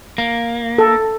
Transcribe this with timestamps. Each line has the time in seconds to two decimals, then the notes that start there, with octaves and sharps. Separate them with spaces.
0.18 A#3
0.78 A4